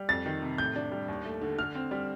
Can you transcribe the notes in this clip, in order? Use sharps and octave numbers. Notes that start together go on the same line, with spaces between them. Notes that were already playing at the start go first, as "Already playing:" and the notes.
Already playing: G3
F2 A6
D#3
C3
A2 G6
D4
G3
D#2
A3
D3
D3 F6
C4
G3